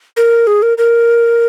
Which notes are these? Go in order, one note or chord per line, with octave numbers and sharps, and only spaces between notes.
A#4
G#4
A#4
A#4